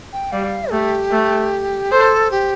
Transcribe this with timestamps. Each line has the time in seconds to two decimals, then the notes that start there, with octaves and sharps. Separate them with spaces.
0.13 G5
0.32 G3 F5
0.72 A3 G4
1.11 A3
1.92 A4 C5
2.31 G4